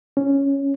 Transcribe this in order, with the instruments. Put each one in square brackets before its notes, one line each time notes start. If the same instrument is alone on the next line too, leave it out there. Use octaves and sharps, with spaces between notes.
[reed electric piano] C#4